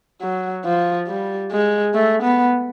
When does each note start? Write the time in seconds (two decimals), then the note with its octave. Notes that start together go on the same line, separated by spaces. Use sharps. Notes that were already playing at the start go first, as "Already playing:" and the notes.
0.22 F#3
0.65 F3
1.08 G3
1.52 G#3
1.94 A3
2.23 B3